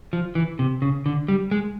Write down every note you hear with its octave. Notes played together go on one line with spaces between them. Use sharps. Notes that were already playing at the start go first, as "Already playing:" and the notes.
F3
E3
C3
C#3
D3
G3
G#3